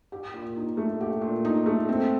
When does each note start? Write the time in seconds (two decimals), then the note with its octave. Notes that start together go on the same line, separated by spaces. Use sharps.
0.12 G4
0.33 A#2
0.56 D#4
0.77 A3
1.01 G4
1.21 A#2
1.45 D#4
1.66 A3
1.89 C4